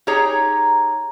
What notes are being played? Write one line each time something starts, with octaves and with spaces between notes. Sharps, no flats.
D#4 G4 G#4 C#5 A#5